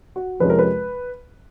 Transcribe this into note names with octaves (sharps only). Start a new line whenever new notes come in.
F#4
F2 C3 F3 G#3 C#4 B4
A#4
B4